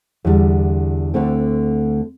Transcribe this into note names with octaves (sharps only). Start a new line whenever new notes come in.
E2 D3 G3
D2 D3 A3 C4